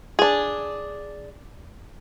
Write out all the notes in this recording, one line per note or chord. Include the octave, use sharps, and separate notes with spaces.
D4 G#4